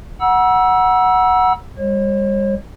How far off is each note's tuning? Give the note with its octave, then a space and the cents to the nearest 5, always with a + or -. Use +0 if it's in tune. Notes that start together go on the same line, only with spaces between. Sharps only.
F#5 +0 A#5 +45 E6 +0
G3 +40 C#5 -45